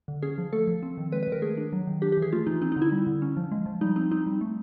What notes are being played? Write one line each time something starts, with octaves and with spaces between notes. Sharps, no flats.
D3
C#4 G#4
F3
A3 A4
F3
C4
D#3
G#3 B4
B4
D#3 A#4
A3 G#4
D4
F#3
D#3
D4 G4
G4
E3
G#4
A3 F4
E3 D#4
C4 D#4
D#4
D3
E4
G3
D3
C#4
F3
G#3
F3
G3 D#4
C4 D#4
C4 D#4
G3
A3